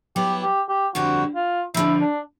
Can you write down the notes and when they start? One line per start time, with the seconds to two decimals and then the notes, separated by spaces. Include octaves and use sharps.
0.16 F#3 B3 E4 G4
0.43 G4
0.69 G4
0.95 F2 D3 G3 C4 E4 F#4
1.35 F4
1.74 F2 D3 F3 E4
2.01 D4